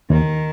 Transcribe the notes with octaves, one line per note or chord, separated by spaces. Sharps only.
D#2 D#3